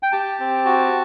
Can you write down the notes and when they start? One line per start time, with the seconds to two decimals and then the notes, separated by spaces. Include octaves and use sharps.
0.03 G5
0.12 G4 A5
0.40 C4
0.65 F#4